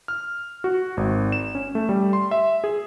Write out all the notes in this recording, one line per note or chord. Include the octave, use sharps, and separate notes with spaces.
F6
F#4
G#1
E7
C#4
A3
G3
C6
E5
G#4